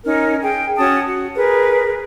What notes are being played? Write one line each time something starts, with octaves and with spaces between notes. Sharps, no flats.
C#4 D#4 A#4
G#4 G5
C#4 F#4 A5 D#6
F#4
G#4 A#4 B4